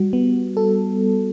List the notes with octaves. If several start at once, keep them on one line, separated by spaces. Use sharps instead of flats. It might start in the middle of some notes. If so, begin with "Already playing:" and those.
Already playing: G3 F#4
B3
A4